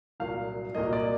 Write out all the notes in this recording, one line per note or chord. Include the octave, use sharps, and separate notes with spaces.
C2 A#2 F#3 A#3 F5
C2 A#2 F#3 A#3 D#5
D5